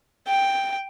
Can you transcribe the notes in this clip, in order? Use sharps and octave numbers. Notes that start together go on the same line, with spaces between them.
G5